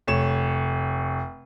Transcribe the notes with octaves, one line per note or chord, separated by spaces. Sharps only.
F1 C#5 E7